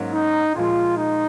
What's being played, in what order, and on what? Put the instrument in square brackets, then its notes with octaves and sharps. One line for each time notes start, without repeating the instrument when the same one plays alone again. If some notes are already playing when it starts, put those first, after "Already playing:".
Already playing: [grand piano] G#2 F#3 A#3 C#4
[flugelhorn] D#4
[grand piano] A#2 F3 G#3 [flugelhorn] F4
[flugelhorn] D#4